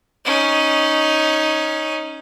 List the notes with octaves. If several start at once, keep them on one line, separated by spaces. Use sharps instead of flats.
C#4 D#4